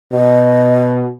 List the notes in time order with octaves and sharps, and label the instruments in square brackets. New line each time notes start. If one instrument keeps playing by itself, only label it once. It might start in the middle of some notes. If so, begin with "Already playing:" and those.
[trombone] B2 [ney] D#5